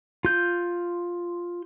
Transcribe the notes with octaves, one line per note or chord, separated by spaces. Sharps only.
F4 G6